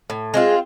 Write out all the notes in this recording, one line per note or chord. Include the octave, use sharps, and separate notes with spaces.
A2
G#3 C4 F4